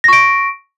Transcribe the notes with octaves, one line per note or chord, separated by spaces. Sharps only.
C#6 A#6 D7